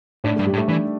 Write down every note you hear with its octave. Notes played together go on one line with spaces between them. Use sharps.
A2 D4
G2 A3
G3
A2
A3
E3 D4